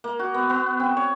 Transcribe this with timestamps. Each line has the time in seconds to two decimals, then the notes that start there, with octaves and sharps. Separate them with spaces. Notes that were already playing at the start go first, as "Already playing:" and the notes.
0.04 A#3
0.19 F#4
0.34 B3
0.50 B3
0.80 C4
0.97 C#5